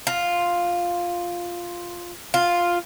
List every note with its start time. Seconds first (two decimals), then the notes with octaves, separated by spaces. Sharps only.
0.07 F4
2.34 F4